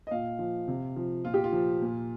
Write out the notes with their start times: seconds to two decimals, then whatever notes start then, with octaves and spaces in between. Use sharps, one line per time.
0.07 D#5
0.11 A#2 F5
0.39 F3
0.68 C3
0.96 F3
1.25 A#2 F4
1.34 G4
1.44 F4
1.52 F3
1.82 A#2